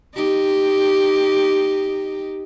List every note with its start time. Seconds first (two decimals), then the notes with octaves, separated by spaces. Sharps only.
0.15 D#4 G4